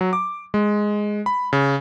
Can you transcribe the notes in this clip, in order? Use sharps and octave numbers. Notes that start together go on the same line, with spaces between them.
F#3
D6
G#3
B5
C#3